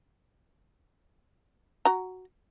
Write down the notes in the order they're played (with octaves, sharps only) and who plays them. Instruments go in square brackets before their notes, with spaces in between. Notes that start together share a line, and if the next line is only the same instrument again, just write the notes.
[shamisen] F#4 A#5